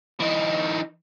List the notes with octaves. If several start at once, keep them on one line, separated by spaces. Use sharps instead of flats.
E3 D#4